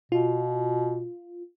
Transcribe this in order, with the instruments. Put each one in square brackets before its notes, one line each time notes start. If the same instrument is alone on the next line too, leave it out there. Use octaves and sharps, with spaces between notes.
[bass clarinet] B2 [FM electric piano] F4